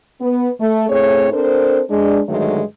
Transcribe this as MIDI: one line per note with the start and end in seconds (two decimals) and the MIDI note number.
0.21 0.49 59
0.60 0.88 57
0.90 1.28 45
0.90 1.28 57
0.90 1.28 60
0.90 1.28 68
0.90 1.28 73
1.33 1.81 60
1.33 1.81 62
1.33 1.81 69
1.33 1.81 70
1.33 1.81 72
1.90 2.22 56
1.90 2.22 62
2.29 2.62 43
2.29 2.62 50
2.29 2.62 51
2.29 2.62 54
2.29 2.62 56
2.29 2.62 57